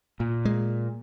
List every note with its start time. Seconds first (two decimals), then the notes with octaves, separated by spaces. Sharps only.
0.20 A#2
0.45 G#3